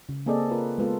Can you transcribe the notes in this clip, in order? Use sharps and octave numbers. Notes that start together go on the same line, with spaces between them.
C#3
A#3 C4 G#4 A4 D5 D#5
F4 A#4 B4
G#3 B3 F4 A4